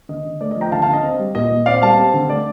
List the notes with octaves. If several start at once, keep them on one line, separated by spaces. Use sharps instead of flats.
D3 D#5
D3
A3 D5
D#5
F3
G5 A#5
D3 F5 A5
F5 A5
D3
D#5
C4
G3
A#2 D#5
A#2
C4 D5 F5
G3 F5 A5
C4
D3
A3 D5